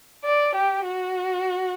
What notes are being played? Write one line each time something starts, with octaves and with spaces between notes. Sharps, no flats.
D5
G4
F#4